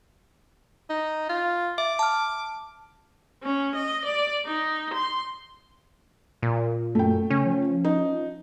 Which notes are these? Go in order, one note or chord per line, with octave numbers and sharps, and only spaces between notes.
D#4
F4
E5 D6
A5 F6
C#4
D#5
D5
D#4
C6
A#2
F#2 A3 G5
C#3 C#4
F3
D#4